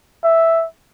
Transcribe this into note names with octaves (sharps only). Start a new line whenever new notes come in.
E5